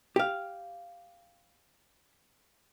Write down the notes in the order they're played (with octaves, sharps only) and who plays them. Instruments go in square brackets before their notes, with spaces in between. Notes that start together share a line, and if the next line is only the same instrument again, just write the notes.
[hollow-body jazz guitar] G4 F5